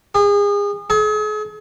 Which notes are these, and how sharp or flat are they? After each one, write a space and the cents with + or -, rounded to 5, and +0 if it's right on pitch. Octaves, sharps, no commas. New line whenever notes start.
G#4 -35
G#4 +40